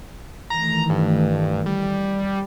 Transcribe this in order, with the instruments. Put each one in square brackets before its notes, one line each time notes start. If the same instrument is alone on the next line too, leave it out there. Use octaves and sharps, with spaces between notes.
[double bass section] D#3 E3 A3 [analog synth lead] A#5
[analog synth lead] G2
G3